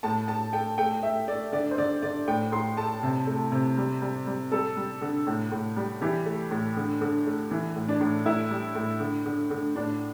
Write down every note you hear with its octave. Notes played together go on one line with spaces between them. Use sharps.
A2 A5
A2 A5
A3 G5
A3 G5
A3 E5
A3 D5
D3 D5
C5
D3 D5
D3 D5
A2 G5
A2 C6
A3 A5
C3
A3
C3
G3
G3
G3
G3 A4
G3
D3
A2
A2
G3
E3 G4
A3
A2
D3
D3
A3
E3
A2
D4
A2
A2 E4
G3
A2
D3
D3
D3
A2 D4